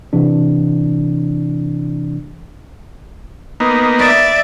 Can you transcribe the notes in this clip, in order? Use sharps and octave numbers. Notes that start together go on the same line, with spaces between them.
C3 E3 D4
A#3 B3 D#4
D5 E5